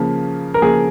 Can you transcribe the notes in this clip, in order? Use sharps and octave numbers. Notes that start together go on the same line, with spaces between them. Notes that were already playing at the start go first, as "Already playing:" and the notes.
Already playing: C#3 F3 A#3
A#4
C#3 F3 A#3 G#4